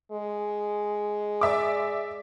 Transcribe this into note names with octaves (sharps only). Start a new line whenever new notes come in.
G#3
D5 E5 D6